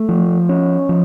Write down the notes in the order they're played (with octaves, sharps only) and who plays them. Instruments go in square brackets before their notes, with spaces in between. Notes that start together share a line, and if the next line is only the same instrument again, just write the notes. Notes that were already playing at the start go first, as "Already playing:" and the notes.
Already playing: [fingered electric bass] A3
F3
C#4
F3